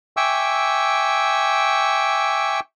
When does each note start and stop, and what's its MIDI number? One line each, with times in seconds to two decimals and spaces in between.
0.17 2.60 76
0.17 2.60 79
0.17 2.60 80
0.17 2.60 85
0.17 2.60 86
0.17 2.60 88